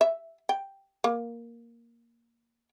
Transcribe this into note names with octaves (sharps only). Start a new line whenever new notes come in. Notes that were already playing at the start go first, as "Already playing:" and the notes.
E5
G5
A#3